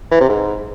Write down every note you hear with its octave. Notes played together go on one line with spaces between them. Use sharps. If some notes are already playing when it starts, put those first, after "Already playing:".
E3
C3
G#2